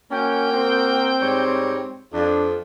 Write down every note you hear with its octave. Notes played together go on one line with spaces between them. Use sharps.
A#3 C#4 F#4 A#4 G5
C4
G#2 G3 C#5
F2 D4